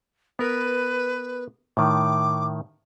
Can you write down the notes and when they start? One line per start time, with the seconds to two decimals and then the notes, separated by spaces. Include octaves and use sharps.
0.39 B3 A#4 B4
1.77 A2 D#3 D6